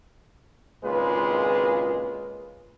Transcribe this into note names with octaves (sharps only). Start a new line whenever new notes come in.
G#1 C#2 A#2 G#3 F4 B4